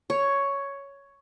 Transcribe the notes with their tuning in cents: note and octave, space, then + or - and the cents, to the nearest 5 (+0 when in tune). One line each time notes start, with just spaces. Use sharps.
C#5 +5